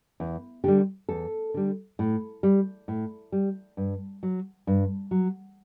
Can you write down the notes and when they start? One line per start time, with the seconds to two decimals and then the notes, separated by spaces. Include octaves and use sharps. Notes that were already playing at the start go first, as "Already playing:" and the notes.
0.20 E2
0.64 D3 G3 G4
1.09 E2 A4
1.54 D3 G3
1.99 A2
2.43 G3
2.88 A2
3.32 G3
3.77 G2
4.23 F#3
4.67 G2
5.11 F#3